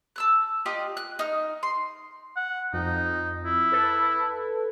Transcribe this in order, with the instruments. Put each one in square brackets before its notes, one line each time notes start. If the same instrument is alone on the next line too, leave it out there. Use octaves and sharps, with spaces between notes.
[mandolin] A5 E6 F#6
F4 G4 D5 D#5
F#6
D#4 F6
C6
[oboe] F#5
[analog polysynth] F2 [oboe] D#4
[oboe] E4
[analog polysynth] A4 B4